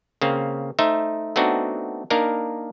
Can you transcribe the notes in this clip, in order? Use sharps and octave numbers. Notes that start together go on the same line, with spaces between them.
C#3 A#3 C4
A3 D#4 C5 E5
A3 B3 C4 D4 D#4 F#4
A#3 D4 D#4 A#4